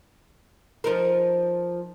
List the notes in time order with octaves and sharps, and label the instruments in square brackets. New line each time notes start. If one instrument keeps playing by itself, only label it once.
[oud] F3 D#4 A#4